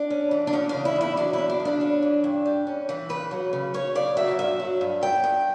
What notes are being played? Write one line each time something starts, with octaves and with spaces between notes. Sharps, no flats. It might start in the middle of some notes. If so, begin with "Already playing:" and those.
Already playing: D4
C#4
E3
D4
E2 C#4
C#3 D4
E4
E2 E4
F#3 D4
E2 E4
D4
C#3
D4
C#4
E3
G2
G3
C#4
E3
C#3 B4
F#3
C#3
C#4 C#5
C#3 D5
F#3 E5
G2 E5
F#3
G2
B3 G5
G2